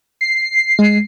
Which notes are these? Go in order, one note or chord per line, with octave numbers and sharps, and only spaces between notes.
C7
G#3